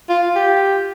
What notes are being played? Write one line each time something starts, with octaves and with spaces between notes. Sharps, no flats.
F4
G4